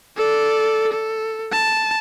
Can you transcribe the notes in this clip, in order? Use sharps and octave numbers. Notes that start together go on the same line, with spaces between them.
A4 D5
A4
A5